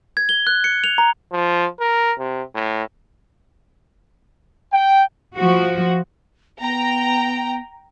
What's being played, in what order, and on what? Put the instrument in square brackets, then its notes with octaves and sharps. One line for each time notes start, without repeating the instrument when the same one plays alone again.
[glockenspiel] G#6
G7
F#6
C#7
F7
A#5
[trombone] F3
A#4
C3
A2
[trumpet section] G5
[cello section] F3 F#4
[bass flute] B3 [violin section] G5 A#5